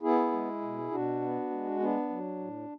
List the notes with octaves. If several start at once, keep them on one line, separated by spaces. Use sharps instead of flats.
B3 E4 G#4
G#3
B2
B2 D4 F#4
B3
G#3
B3 D4
F#3
A2